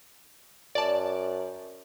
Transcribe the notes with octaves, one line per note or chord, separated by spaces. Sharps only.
F#2 D5 A5